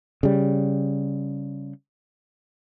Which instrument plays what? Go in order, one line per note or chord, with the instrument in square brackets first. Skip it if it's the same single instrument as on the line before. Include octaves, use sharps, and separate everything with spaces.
[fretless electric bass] C#3 G3